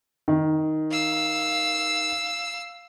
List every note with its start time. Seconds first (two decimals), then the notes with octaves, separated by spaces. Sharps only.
0.28 D#3
0.91 F5 E6